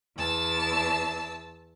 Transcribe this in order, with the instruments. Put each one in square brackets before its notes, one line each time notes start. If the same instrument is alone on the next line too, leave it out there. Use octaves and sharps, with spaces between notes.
[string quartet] E2 A5 E6